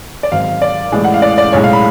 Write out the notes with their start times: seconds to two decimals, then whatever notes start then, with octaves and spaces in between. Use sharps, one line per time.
0.23 D5
0.32 G#1 G#2 F#3 F5
0.62 D5
0.92 A1 A2 G#3
1.04 F#5
1.14 F5
1.22 D5
1.38 D5
1.52 B1 A2 G#3 C#5
1.64 F5
1.73 B5